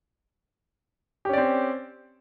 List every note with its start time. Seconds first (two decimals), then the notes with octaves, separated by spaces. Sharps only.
1.25 G4
1.29 C#4
1.33 D5
1.38 C4